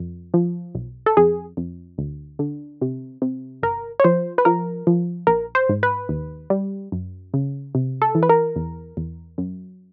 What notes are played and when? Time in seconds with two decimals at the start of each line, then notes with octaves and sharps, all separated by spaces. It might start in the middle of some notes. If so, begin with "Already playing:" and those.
Already playing: F2
0.34 F3
0.75 B1
1.06 A4
1.17 F2 G#4
1.57 F2
1.98 D2
2.39 D3
2.81 C3
3.22 C3
3.63 G1 A#4
4.00 C#5
4.04 F3 C5
4.38 B4
4.45 F3 A#4
4.87 F3
5.27 A#1 A#4
5.55 C5
5.69 G#2
5.83 B4
6.09 D#2
6.50 G3
6.92 F#2
7.34 C#3
7.75 C3
8.02 A4
8.15 E3
8.23 B4
8.29 A#4
8.56 E2
8.97 E2
9.38 F#2